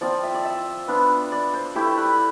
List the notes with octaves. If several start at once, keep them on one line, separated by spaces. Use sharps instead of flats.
F3 C4 F4 D5
E5
D5
E5
B3 D4 F4
D5
C5
A3 E4 G4
B4